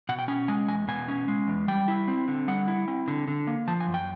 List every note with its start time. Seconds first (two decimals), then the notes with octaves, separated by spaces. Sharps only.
0.09 B2 F#5
0.19 G5
0.28 C#4 G#5
0.48 G#3 G#5
0.68 E2 G#5
0.88 B2 G#5
1.08 C#4
1.28 G#3
1.48 E2
1.68 G3 G5
1.88 E4
2.08 C4
2.28 D3
2.48 G3 F#5
2.68 E4
2.88 C4
3.08 D3
3.28 D3
3.47 A#3
3.68 F3 A5
3.81 G#5
3.87 F#2
3.94 G5